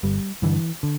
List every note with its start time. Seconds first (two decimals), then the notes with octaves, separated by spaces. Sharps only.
0.03 G1 G3
0.42 G2 D3 E3
0.83 D3